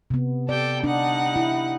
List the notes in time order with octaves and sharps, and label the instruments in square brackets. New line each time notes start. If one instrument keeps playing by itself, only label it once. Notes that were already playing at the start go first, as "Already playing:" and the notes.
[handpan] C3 B3
[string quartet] G4 A4 G5 [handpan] D5
[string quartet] G3 D#4 F#5 [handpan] D4
[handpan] E4